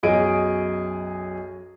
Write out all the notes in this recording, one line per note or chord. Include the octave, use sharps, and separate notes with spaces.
B1 F#2 G#4 D#5 D7